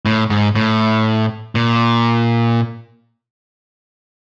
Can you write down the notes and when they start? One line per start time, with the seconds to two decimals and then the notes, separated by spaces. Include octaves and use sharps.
0.06 A2
0.30 G#2
0.55 A2
1.55 A#2